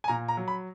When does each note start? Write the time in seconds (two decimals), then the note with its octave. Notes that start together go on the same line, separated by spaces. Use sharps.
0.04 G#5
0.08 A#2 A#5
0.28 A#5
0.37 F#3
0.48 B5